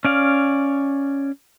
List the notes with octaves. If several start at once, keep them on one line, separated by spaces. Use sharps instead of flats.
C#4 D5 F5